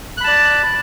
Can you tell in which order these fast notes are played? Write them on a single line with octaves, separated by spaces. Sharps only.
F#6 B5 A5 D5